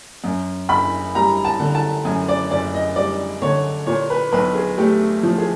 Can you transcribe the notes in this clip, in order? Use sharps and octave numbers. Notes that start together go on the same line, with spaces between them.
F#2
F#1 B5
G3 A#5
A5
D3
A5
F#2 G#5
D5
F#1 D5
D#5
G3 D5
D3 C#5
A#2 C#5
B4
B1 B4
G#4
A3 G4
F3
G#4